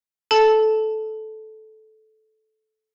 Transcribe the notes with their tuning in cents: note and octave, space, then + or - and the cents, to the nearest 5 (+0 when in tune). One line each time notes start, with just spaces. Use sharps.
A4 -15 A5 -5